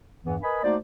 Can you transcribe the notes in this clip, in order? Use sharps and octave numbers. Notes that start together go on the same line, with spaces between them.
E2 G2 E3 B3
A#4 B4 D#5 G#5 B5
A3 A#3 D#4 F#4 C5 D5